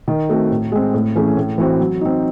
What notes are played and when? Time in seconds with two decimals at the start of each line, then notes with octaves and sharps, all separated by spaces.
0.08 D#3
0.29 A3 C4 F#4
0.51 A2
0.72 G#3 C4
0.94 A2
1.15 E3 A3 C#4 G#4
1.37 A2
1.58 E3 C4 F#4 C5
1.80 F#3
2.01 C4 D#4